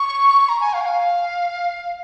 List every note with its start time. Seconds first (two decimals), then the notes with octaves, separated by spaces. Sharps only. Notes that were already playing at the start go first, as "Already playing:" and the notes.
Already playing: C#6
0.49 A#5
0.60 G#5
0.73 F5
0.81 G#5
0.86 F5